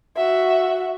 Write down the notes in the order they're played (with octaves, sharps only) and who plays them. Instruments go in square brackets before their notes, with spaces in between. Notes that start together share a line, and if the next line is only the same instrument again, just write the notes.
[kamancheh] F#4 E5